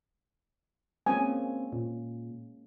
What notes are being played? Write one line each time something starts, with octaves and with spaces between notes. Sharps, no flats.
G#3 A#3 C4 C#4 G#5
A#2